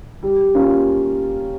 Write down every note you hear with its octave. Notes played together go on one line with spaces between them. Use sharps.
G3
A#3 C#4 F4